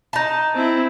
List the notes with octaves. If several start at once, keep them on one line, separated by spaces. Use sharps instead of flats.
D#4 A5
C4 E4